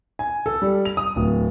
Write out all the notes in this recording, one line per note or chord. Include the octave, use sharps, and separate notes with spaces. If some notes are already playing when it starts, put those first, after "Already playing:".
G#5
A4
G3
F7
D#6
D1